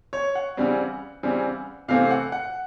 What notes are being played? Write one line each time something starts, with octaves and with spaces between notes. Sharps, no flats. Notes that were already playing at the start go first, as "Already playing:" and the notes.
C#5
F#5
C#3 E3 G3 C4
C#3 E3 G3 C4
C3 E3 A3 C4 F5
F#5
F#5